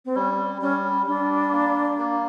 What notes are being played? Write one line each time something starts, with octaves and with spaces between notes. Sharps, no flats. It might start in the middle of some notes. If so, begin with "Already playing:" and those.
C4
G3 C#4
G3 C#4
G3 D4
A#3
A#3